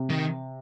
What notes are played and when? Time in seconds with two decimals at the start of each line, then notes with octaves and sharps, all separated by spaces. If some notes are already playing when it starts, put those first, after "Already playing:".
Already playing: C3
0.10 D#3